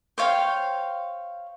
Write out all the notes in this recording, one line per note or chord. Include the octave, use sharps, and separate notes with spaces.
C5 C#5 F5 G5